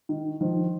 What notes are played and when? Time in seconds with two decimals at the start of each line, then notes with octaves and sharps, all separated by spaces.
0.09 D#3
0.41 D#3 F3